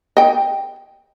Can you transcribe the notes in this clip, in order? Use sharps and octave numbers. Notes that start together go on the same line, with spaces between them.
D#5 G5